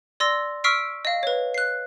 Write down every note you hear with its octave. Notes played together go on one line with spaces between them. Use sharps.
D5 C6 E6 A#6
C#6 E6 F6 B6 C7 D7
D#5 F5
B4 C#5
F#6 C7